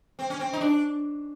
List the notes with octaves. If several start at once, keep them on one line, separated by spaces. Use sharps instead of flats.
C4
C#4
C4
D#4
D4